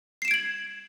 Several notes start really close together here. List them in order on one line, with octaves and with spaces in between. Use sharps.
C7 E7 D7 G#6 F#7